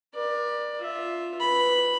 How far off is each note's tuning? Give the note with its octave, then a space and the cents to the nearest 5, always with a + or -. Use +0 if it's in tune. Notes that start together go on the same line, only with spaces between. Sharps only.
A#4 +40 D5 +15
F4 +0 E5 +0
B4 +0 B5 +0